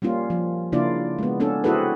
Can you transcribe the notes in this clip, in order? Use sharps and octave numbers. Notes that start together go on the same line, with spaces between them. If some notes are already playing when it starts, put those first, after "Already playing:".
G3 A#3 C#4 F4
F3
C#3 A#3 D4 E4 F4 D5
G#3 B3
B3 C#4 D4 A4
C4 E4 F#4 G#4 A4 B4